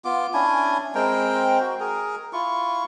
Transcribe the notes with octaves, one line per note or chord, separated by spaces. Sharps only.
B3 F4 D6
C#4 D4 E4 G#5
G#3 C4 A#4 G5
F#4
G#4 A#4
E4 F4 C#6